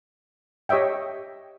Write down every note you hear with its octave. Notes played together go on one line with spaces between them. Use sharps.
G4 C#5 D#5 E5 G5